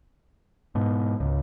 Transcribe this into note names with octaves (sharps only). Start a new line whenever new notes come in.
G#2 B2
C#2